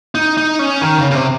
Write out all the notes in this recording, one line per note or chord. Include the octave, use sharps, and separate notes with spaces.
D#4
D#4
C#4
D#3
C#3
C#3
C3